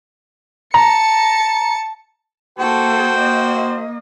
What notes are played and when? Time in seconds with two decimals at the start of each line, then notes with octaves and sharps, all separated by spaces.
0.74 A5 A#5 C#7
2.59 A#3 F#4 A4 C5 G5
3.17 A#3 D#5